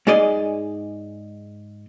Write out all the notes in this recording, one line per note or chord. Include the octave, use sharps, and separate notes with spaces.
G#2 G#3 G#4 D5 D#5